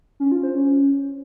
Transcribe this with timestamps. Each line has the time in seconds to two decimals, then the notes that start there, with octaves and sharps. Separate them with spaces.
0.20 C#4
0.32 F4
0.43 C5
0.55 C#4